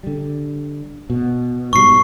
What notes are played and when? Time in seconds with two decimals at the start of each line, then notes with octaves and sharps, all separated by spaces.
0.03 D3 G3
1.10 B2
1.73 G#2 B2 G3 C#6 C7